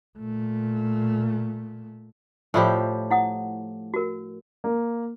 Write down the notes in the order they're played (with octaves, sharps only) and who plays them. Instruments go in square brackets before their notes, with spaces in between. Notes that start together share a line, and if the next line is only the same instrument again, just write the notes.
[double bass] A#2 A3
[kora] A2 F3 G4 [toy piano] D5 E5 B5
[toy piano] E4 F#5 D#6
F#4 A#4
[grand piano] A#3